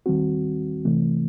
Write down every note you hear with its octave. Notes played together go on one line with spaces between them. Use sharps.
D#2 D#3 G3 C4 F#4
C3 E3 A3